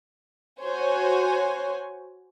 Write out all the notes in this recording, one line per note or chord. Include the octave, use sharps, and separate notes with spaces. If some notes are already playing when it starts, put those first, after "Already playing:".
F#4 C5 C#5 G#5